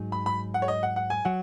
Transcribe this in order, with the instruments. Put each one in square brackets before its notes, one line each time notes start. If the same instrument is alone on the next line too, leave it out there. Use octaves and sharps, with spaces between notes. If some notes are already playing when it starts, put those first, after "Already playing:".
Already playing: [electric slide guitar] G#2 F#3 D#4 G#4
[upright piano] B5
B5
F#5
C#5
D#5
F#5
F#5
G#5
[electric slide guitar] F#3 [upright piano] F#5